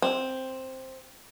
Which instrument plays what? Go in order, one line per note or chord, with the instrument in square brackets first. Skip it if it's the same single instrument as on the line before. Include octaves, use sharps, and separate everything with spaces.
[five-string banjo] C4